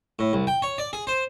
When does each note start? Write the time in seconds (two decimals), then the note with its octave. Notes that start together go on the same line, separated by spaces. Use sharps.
0.19 A2
0.33 C2
0.47 G5
0.62 C#5
0.78 D5
0.93 G#4
1.07 C5